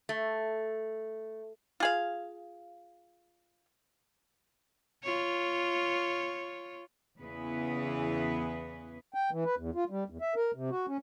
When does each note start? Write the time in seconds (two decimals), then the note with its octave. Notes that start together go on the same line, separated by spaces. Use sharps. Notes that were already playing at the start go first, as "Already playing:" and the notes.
0.09 A3
1.80 F4 G#4 F5
5.03 F4 C#5
7.20 E2 C#3 E3 B3 G#4 B4
9.14 G5
9.32 E3
9.45 B4
9.57 E2
9.75 F4
9.90 G3
10.10 E2
10.21 E5
10.36 A#4
10.54 C3
10.70 F#4
10.88 C#4